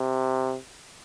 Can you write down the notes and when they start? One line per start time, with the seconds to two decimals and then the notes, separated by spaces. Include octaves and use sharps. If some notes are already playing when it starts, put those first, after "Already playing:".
Already playing: C3